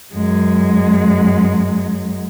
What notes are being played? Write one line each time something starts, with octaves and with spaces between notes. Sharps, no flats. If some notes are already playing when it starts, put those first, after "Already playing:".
F#2 G#3